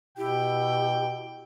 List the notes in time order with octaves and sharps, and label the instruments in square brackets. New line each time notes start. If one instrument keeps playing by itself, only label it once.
[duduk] B2 [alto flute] E4 [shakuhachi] G4 [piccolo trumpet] G5